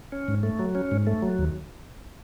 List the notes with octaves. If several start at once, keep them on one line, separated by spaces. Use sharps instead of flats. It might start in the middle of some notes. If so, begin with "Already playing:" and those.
C#4
G#2
A3
F#3
C#4
G#2
A3
F#3
D#2